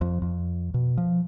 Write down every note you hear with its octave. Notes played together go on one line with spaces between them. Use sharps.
F2
F2
B2
F3